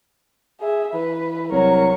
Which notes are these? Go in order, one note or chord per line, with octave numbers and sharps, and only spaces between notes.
G#4 E5
E3 B4
C2 F#3 A#4 C#6